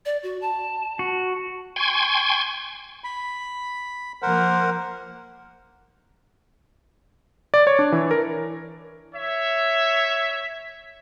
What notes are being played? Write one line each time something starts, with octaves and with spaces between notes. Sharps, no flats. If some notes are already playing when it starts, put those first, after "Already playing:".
D5
F#4
A5
F#4
G5 G#5 C6 C#6 G#6
B5
F3 A#3 A#4 C5 F#5
D5
C#5
D4
E3
A#4
C#5 E5